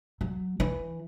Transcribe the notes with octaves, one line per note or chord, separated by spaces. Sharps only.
F#3
E3